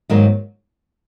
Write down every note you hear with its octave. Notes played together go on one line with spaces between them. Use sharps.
G#2 D#3 F#3 A#3